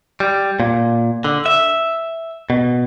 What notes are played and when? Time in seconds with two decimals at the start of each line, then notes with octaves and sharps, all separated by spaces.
0.20 G3
0.60 A#2
1.24 D3
1.46 E5
2.50 B2